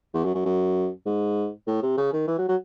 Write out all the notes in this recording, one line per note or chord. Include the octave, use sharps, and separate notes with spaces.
E2
F#2
F#2
F#2
G#2
A2
C3
C#3
D#3
E3
F#3
F#3